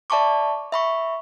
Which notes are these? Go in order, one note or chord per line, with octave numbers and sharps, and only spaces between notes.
D5 E5 A5 B5 C#6 D6
E5 B5 C#6